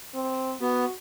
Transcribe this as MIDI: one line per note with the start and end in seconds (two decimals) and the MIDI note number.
0.15 0.55 60
0.61 0.85 59
0.61 0.93 66